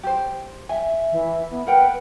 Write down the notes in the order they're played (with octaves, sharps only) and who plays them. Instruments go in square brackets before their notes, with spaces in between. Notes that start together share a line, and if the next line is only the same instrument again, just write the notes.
[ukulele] G4 C5
[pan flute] E5 [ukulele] G#5
[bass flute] E3
B3
[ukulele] A#4 F#5 G5 [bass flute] B4